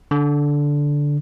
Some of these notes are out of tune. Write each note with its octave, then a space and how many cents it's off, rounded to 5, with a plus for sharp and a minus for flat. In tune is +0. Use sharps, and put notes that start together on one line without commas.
D3 -10